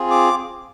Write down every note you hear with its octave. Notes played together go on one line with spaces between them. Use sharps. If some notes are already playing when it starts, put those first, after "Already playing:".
Already playing: C4 F4 G#4
D6